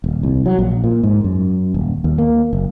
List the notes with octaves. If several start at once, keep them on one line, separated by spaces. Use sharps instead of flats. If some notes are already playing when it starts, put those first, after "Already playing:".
D#1
C2
F#3
A#1
A#2
G#2
F#2
D#1
D#2
A#3
F#1